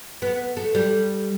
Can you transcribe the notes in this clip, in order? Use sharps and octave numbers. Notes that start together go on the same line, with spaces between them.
B3
A3
G3